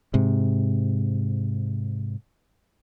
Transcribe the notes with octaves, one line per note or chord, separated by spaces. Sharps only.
G#2 C3